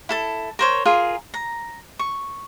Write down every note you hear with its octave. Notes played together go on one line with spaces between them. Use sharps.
E4 A4 A5
A#4 C5 C#5
F4 G#4 A#4
A#5
C#6